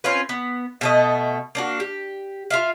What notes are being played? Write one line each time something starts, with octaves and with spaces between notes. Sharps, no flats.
C4 C#4 F4 B4
B3
B2 A3 D#5
A#3 D4 F#4
G4
F4 E5 F5